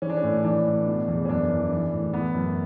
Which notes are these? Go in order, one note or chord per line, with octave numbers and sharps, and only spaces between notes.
E3 C#4
D4
C#4
A2
E3 D4
A2
B2
E2
C#4
F#2 D4
E3
E3
A2
E3 B3
F#2